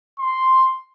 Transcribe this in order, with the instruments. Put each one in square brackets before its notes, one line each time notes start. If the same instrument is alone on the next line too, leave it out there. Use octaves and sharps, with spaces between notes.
[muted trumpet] C6